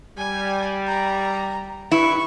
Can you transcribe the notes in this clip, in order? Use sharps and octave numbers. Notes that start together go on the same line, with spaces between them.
G3 G#5
A#5
G2 E4 B4 C#6